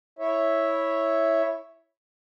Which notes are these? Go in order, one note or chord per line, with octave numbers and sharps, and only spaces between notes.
E4 C#5 E5